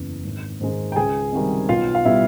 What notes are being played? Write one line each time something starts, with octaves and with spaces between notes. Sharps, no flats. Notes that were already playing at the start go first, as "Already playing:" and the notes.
Already playing: F#1 E2 C#3
G#1
G#2 D#3 G#3
G5
C#2 G#4 G#5
C3 D#3 G3
B1 F4 F5
F5
B2 G3 B3 E4 E5